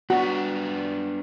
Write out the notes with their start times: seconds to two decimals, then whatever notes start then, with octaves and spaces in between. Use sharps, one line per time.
0.10 B3 D4 F#4